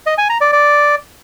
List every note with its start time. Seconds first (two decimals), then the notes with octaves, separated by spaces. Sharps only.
0.06 D#5
0.18 G#5
0.29 A#5
0.41 D5
0.53 D5